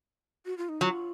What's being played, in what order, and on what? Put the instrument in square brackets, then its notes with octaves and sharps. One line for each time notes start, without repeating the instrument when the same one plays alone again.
[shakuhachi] F#4
F4
D#4
[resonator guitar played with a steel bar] F#3 [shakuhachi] F4